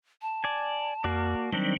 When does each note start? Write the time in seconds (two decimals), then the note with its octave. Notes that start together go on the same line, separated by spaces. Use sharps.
0.22 A5
0.44 D5 G#5
1.04 F2 A#3 F#4 D5
1.53 D#3 F#3 G3 C4 D4